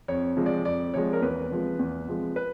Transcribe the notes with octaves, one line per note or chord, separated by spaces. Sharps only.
F2 C#5
C3 F3 G#3
D5
F2 D5
C3 F3 G#3 C#5
A#4
E2 B4
C3 F3 G#3
E2
C3 F3 G#3
B4